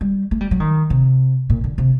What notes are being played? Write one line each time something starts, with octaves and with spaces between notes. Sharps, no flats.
G3
A3
G3
F#3
D#3
C3
A#2
D3
C3